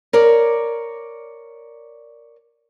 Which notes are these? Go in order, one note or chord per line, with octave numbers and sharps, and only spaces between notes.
A#4 C#5 D5